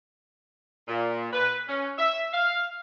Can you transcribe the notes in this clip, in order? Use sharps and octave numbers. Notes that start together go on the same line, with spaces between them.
A#2
B4
C#4
E5
F5